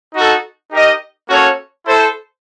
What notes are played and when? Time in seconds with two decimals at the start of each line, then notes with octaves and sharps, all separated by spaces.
0.14 D#4 F#4 A4
0.72 D#4 G4 A#4 D#5
1.29 A#3 C#4 F#4 A4 C#5
1.86 E4 A4 C5